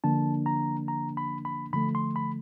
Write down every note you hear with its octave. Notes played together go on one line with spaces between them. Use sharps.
D3 F3 A#3 D4 A5
A#5
A#5
B5
B5
D3 F3 A3 B5
C6
B5